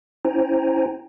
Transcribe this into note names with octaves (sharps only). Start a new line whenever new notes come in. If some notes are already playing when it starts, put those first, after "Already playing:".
C#4 E4 C5 G5 G#5 A#5